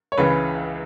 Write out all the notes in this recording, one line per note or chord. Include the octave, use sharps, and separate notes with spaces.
C#5
C#2 C#3 E3 B4